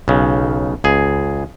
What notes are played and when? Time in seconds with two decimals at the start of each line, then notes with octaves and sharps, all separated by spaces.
0.08 B1 C#3
0.84 C#2 G#4